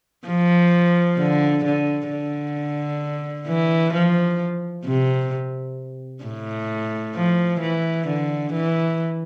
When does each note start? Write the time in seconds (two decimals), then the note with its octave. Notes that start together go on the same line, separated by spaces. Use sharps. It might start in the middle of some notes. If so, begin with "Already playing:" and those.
0.27 F3
1.18 D3
1.65 D3
2.10 D3
3.48 E3
3.94 F3
4.85 C3
6.24 A2
7.15 F3
7.60 E3
8.07 D3
8.53 E3